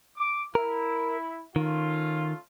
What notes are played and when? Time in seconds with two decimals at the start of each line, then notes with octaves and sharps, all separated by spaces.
0.17 D6
0.55 E4 A#4
1.56 D#3 A3 C#4 F4